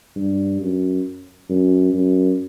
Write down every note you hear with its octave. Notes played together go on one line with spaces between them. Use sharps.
G2
F#2
F#2
F#2